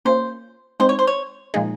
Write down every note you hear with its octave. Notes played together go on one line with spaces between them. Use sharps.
A#3 C#4 F4 C5
G#3 C4 D#4 C5
C#5
C5
C#5
A#2 F3 G#3 D#4 G#4